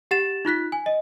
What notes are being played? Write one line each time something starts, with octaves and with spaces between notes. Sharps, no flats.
G4 F#5 A6 E7
D#4 F4 F#6 B6
G#5
D#5